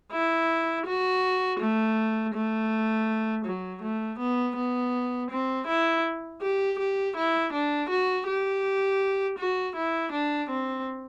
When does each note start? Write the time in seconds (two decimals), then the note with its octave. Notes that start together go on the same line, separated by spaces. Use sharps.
0.12 E4
0.86 F#4
1.60 A3
2.34 A3
3.45 F#3
3.82 A3
4.19 B3
4.56 B3
5.31 C4
5.67 E4
6.42 G4
6.79 G4
7.17 E4
7.53 D4
7.90 F#4
8.27 G4
9.38 F#4
9.76 E4
10.12 D4
10.50 C4